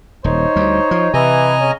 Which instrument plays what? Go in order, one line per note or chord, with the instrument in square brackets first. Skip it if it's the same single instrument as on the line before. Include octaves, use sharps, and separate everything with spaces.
[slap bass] D#1 [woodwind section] D#4 C5 C#5
[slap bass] D2 G3
F3
[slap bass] C3 [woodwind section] E3 [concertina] D#5 G#5 A#5
[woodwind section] C#3 C#4